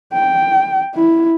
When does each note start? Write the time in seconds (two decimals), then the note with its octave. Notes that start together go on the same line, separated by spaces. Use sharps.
0.13 G5
0.95 E4